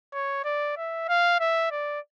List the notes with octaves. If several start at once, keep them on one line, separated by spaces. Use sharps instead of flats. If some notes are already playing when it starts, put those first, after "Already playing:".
C#5
D5
E5
F5
E5
D5